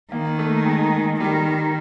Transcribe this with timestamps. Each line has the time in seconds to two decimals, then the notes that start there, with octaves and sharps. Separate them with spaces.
0.12 D#3 A#3
0.39 A3
0.66 G#3
1.20 D#3 G3